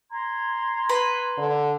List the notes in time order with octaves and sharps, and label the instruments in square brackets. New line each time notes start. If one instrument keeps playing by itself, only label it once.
[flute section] A#5 C6 G#6
[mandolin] B4
[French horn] D3